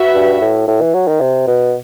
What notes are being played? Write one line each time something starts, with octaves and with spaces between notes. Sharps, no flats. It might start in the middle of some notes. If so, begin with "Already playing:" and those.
Already playing: F#4 B4 E5
G2
A2
A2
E3
F#3
D#3
C3
B2